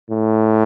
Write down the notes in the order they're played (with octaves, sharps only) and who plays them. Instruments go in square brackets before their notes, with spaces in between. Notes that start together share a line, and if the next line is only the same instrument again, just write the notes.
[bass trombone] A2